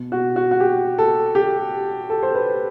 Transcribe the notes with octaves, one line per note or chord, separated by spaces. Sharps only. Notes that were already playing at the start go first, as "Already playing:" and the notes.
Already playing: B2
F#4
F#4
F#4
G4
A4
G4
A4
C5
B4